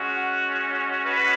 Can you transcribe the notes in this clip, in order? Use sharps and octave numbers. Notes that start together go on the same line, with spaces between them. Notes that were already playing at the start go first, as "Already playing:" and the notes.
Already playing: G#3 C#4 F#4
F#5
B4